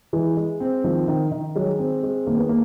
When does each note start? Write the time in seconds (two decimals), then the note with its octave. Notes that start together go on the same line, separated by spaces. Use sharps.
0.13 E3 G#3
0.37 G#3
0.60 C4
0.84 D#3 F3
1.08 D#3
1.32 D#3
1.56 F#3 G#3
1.79 C4
2.03 G#3
2.27 D#3 A#3
2.38 B3
2.49 A#3